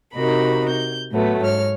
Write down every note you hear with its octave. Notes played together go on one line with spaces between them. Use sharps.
C3 D#4 F#4 A#4 B5
G6
A2 F#3 A3 B3
G#2 C#5 F6